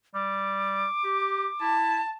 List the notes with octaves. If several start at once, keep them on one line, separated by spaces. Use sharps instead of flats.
G3 D6
G4
E4 A5